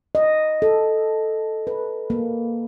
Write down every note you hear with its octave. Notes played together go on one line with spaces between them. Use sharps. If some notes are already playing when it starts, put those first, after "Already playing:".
D#5
A4
B4
A#3